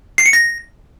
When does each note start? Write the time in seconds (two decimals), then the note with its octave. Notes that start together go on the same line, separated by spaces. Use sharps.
0.18 C7
0.26 C#7
0.33 A#6